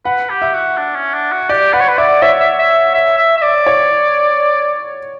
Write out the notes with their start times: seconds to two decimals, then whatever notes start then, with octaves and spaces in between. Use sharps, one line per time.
0.05 B4 F#5
0.30 G4
0.42 E5
0.54 F#4
0.77 D4
0.96 C#4
1.14 D4
1.32 F#4
1.49 G4 D5
1.73 B4 F#5
1.81 C#5
1.88 B4
1.98 D5 E5
2.22 C#5 E5
2.40 E5
2.59 E5
2.94 E5
3.18 E5
3.37 E5
3.42 D5
3.67 C#5